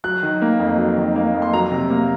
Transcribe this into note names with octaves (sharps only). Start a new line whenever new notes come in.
F#3 F#6
D#3
A#3
F2
F#3
D#3
A#3
F2
C6
F#3 A#5
C3
A#3